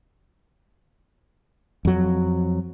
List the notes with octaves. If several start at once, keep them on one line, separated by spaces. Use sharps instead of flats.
F2 F#3